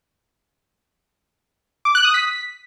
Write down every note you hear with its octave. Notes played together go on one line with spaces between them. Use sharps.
D6
F#6
D#6
B6